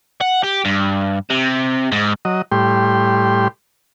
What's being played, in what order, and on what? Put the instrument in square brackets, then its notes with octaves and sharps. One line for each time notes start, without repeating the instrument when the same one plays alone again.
[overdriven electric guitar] F#5
G4
G2
C3
G#2
[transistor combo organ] F#3 D#5
A2 G3 G4 C6